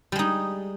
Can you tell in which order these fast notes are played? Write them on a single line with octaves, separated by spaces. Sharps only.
G3 G#3 D#4